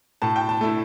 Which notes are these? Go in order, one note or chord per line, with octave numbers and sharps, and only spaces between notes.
A2 A5
G5
A5
A3 E4